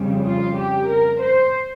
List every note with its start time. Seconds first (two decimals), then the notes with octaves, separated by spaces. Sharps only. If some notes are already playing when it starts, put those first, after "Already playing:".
Already playing: F2 C#3 G3
0.25 F4
0.57 G4
0.88 A#4
1.21 C5